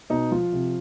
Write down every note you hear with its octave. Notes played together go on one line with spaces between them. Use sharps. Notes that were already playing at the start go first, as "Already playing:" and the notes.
B2 D#4
F3 F4
C3